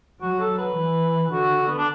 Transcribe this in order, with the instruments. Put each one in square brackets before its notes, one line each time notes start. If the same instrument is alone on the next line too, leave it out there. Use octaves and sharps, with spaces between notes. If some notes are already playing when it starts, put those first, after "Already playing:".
[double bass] F#3 [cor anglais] F#4
[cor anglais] A4
B4
[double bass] E3
[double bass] D3 [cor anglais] F#4
[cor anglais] B3
D4